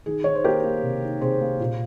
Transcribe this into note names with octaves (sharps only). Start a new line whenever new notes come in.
D#3 G#4
D#3 C#5
C5
A#3 G4 A#4
A#3
C3
D#4
C3 G#4 C5
A#3
A#2